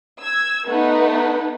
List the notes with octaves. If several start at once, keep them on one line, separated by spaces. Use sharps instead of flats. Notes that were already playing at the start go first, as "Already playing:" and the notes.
E6 G#6
A3 B3 D#4 B4 F#5